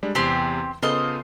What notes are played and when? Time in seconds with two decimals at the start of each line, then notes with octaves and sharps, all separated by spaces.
0.03 G3 G#3 D4
0.15 E2 C3 C4 G4 C6
0.83 C#3 B3 F4 A4 C5 D#5